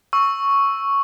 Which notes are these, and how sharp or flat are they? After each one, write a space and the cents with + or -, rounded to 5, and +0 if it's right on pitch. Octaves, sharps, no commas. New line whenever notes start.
C#6 +0 E6 +0